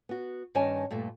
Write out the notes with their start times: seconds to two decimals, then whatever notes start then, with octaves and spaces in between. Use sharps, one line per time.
0.09 B3 F#4
0.55 G2 D#3 C#4 C#5 G#5 A5
0.91 G2 A#2 A3